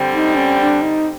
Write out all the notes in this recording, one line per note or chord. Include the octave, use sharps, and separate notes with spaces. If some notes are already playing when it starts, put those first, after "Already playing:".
Already playing: D3 G3 C4
D#4
C#4
D4
D#4